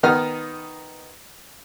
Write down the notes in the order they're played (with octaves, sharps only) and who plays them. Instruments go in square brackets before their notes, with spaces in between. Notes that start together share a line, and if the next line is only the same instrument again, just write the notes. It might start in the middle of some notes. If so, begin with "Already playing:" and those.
[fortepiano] D#3 B3 D#4 F6